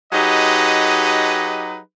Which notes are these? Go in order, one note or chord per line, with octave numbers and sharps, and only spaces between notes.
F#3 D#4 G4 G#4 B4 D#5